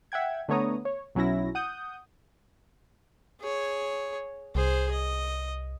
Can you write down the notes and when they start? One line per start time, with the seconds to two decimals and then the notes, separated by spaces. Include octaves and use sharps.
0.12 E5 F#5 G5 G#6
0.48 D3 A3 B3 C#5 A#5 D#6
0.85 C#5
1.15 B1 F#3 C#4 E4 A#6
1.55 F#5 D#6 G6
3.41 G#4 C#5
4.55 C2 G#4 C5
4.91 D#5